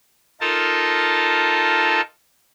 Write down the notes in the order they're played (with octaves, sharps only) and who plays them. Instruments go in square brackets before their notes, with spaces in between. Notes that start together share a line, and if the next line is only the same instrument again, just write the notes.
[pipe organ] D#4 F4 A4 A#4 A5